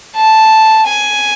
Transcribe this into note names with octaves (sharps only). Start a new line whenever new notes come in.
A5
G#5